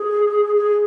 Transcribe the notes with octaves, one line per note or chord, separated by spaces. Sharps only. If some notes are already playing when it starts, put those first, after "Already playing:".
Already playing: G#4
G#4